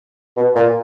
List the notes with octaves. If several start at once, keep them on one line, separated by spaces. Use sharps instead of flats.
B2
A#2